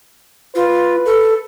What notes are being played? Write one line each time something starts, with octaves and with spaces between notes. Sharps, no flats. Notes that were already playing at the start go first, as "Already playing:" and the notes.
F4 B4
A4